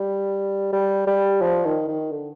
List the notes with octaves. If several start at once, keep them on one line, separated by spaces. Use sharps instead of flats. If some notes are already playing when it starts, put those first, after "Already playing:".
Already playing: G3
G3
G3
F3
D#3
D#3
D3